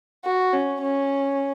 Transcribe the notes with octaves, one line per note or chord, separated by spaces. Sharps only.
F#4
C#4
C#4